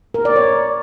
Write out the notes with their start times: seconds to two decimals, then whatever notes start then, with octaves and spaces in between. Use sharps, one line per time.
0.14 A#4
0.25 D5
0.36 C#5